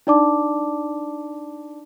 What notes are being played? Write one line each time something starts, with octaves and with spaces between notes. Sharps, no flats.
D4 D#4 D5 A5 D6